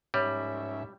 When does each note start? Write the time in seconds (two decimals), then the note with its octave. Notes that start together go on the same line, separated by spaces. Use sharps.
0.14 G#2 G3 C#4 C#5 E5